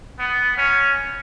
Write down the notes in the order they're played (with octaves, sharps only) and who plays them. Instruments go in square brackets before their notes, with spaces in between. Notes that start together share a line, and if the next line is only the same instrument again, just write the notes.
[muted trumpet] B3
C#4